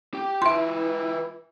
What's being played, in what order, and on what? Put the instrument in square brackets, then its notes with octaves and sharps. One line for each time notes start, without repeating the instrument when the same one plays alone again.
[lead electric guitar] G4 G5
[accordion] E3 E4 [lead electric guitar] F4 B4 [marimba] E5 C6